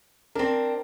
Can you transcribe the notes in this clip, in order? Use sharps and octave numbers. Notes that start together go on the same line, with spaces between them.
C4 D4 A#4